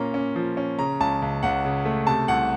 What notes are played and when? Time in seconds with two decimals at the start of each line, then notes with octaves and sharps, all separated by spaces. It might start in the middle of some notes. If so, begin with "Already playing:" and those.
Already playing: A#2 A#3 C#4 A#5
0.14 C#4
0.36 F3
0.57 C#4
0.79 C#3 A#5
1.00 C#2 A5
1.22 C#2
1.43 C#2 F#5
1.65 C#3
1.85 A3
2.07 C3 A5
2.28 C2 F#5